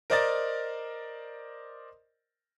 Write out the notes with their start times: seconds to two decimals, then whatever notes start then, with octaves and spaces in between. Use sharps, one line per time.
0.10 A#4 C5 D5 D#5 A#5 A6